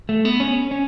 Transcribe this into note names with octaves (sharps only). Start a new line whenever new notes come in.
A3
B3
C#4
C#4